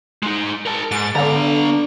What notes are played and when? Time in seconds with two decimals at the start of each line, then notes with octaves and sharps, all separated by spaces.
0.23 G#3 D#4
0.66 A#4 A5
0.91 G#2 A6
1.15 D3 B3 A#5